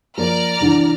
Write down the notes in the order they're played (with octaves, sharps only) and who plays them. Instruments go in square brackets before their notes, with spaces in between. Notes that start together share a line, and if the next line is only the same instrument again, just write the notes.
[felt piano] F3 A#3 [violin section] D5 A#5 F6
[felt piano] C2 D3 E3